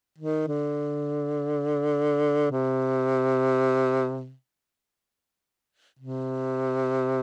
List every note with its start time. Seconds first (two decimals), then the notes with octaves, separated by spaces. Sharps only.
0.18 D#3
0.48 D3
2.51 C3
5.99 C3